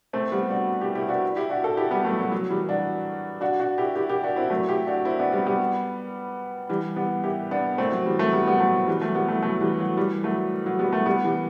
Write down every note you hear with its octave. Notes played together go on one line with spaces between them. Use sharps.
A3 C4
G3 B3
D4 F#4
E4 G4
E4 G4
D4 F#4
E4 G4
D4 F#4
F#4 A4
E4 G4
G3 B3
F#3 A3
F#3
F#3
E3 G3
D4 F#4
D4 F#4
D4 F#4
E4 G4
E4 G4
E4 G4
D4 F#4
C4 E4
F#3 A3
E4 G4
D4 F#4
C4 E4
B3 D4
G3 B3
G3 B3
E3 G3
G3 B3
E4 G4
B3 D4
A3 C4
F#3
E3 G3
F#3 A3
G3 B3
G3 B3
F#3 A3
F#3
E3 G3
F#3 A3
G3 B3
F#3 A3
F#3 A3
E3 G3
F#3
E3 G3
F#3 A3
F#3
G3 B3
F#3 A3
G3 B3
E3 G3